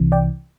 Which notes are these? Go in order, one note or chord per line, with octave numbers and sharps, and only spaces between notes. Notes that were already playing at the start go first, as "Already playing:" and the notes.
Already playing: C2 C3 E3
D5 G5